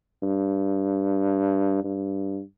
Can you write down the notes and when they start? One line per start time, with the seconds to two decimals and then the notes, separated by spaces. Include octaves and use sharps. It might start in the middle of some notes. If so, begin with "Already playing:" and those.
0.23 G2
1.84 G2